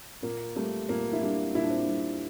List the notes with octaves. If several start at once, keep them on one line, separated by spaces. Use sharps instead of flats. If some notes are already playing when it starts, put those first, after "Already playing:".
A#2 A#3
G3 A3
A#2 A#3
E4
G3 D4
A#2 E4
D4
C4
D4
G3